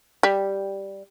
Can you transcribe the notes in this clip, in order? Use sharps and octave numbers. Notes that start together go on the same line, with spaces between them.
G3